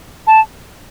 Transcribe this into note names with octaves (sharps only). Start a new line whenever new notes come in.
A5